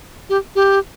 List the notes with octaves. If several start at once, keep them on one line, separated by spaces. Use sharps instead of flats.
G4
G4